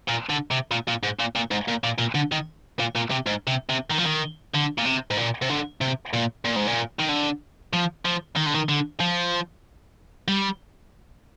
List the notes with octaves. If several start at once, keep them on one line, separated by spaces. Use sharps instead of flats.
A#2
D3
C3
A#2
A#2
G#2
A#2
A#2
G#2
A#2
A#2
A#2
D3
D#3
A#2
A#2
C3
G#2
C3
C3
D#3
F3
D#3
D3
A#2
C3
G#2
A#2
C3
D3
C3
A#2
A#2
G#2
A#2
D#3
D3
F3
F3
D#3
D3
D#3
D3
F3
G3